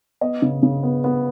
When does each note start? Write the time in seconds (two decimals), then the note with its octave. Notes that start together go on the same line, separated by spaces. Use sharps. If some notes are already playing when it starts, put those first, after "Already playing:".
0.21 B3 D#5
0.42 C#3
0.63 C#3
0.83 B3
1.04 B3